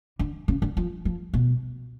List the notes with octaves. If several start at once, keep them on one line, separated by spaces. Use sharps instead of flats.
D3
C#3
D3
F3
F3
B2